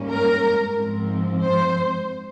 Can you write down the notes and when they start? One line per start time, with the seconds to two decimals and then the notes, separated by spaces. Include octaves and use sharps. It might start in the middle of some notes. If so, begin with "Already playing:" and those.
Already playing: G#2 G3 A#3 C#4
0.10 A#4
0.76 G#2 F3 C4
1.41 C5